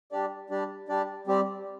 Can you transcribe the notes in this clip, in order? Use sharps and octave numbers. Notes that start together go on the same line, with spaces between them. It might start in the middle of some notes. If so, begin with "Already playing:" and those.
G3 D4 G4 D5
G3 D4 G4 D5
G3 D4 G4 D5
G3 C4 G4 D5